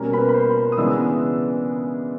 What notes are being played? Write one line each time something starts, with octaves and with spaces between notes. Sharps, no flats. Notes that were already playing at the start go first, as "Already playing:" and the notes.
Already playing: B2 G3 A#3 C#4 A#4 A#5
B4 B5
B5
C5 C6
D#6
C#3 E3 G#3 B3 D4 E5 E6